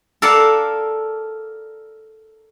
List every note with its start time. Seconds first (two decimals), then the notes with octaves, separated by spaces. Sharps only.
0.22 A4 A#4 D5 F5 F#5 A5